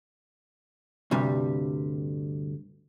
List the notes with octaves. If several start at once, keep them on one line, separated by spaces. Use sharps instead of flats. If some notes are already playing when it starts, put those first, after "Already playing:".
D2 G2 C3 G3